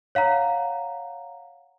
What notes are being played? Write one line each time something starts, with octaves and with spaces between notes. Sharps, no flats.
C#5 F5 F#5 A#5